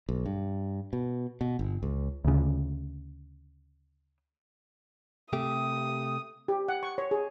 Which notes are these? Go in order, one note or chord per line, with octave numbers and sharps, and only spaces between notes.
B1
G2
B2
B2
G1
C#2
D2 C#3
C3 A3 G4 D#6
G4
F#5
C#6
C#5
G#4